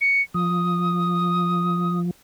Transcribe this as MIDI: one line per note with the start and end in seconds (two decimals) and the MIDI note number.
0.01 0.22 97
0.34 2.11 53
0.34 1.99 87